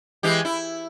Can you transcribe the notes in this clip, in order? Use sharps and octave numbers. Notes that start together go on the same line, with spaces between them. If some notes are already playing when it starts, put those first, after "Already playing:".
E3 G#3 G4
E4